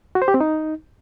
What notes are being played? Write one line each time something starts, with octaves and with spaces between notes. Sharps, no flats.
F#4
C5
G4
C4
D#4